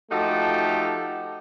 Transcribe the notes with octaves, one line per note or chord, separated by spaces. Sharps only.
F3 A3 D#4 F#4 G4 A4